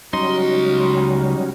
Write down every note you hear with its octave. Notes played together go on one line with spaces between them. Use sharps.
C#2 F#3 G3 C#4 D#4 F#4 C6